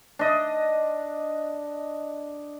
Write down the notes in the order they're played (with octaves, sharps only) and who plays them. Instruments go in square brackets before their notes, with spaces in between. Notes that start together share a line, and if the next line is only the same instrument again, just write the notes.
[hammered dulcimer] D4 D#5